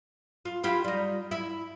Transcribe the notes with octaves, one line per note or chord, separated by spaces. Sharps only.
F4
E4 F4 G4
G3 D#4
E4